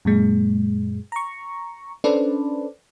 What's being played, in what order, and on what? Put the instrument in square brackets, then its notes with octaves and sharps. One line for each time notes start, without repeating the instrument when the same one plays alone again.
[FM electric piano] F#2 A#2 G#3
A#5 C#6
C#4 D4 A4 B4 C5 D5